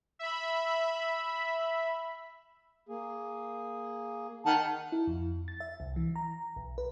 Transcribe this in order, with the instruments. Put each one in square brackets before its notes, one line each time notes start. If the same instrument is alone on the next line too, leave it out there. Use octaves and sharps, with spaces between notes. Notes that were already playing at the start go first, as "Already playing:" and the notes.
[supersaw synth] E5 B5
[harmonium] A#3 G#4
[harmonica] D#3 F#5 A5
[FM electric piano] E4
F2
A6
E5
C2
E3
A#5
B1
B4